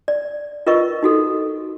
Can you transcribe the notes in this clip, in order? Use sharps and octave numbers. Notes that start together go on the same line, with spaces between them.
D5
F4 A#4 B4 D#5 C#6
D#4 F#4 A4